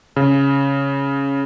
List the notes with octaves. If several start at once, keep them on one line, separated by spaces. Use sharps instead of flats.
C#3